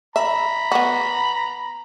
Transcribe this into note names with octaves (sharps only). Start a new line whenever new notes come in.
E5 A#5 B5
B3 F#4